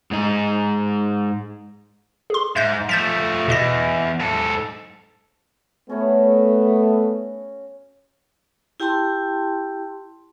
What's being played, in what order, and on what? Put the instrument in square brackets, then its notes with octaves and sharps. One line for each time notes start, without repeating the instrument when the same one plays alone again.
[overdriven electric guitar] G#2 D#4
[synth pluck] G#4 C6
[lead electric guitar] G#2 [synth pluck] E5 G6 A#6
[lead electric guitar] F3 A3 [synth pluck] G6 A6 B6
[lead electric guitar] E2 [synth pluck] B2 D#5 A#6
[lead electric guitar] G#2 A4
[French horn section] A3 B3 [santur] C#4 F#4 C#5
[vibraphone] E4 G4 G5 A5 C6